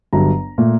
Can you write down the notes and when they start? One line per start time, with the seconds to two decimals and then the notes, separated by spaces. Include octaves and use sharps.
0.13 G1 G2 F#3 A#5
0.58 A#2 A3